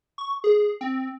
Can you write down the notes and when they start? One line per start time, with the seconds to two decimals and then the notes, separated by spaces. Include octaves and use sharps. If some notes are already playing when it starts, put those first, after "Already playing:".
0.18 C#6
0.44 G#4
0.81 C4